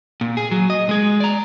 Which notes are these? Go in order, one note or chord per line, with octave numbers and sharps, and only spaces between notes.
A#2
G#4
F#3
D#5
G#3 G#4
D5 A#5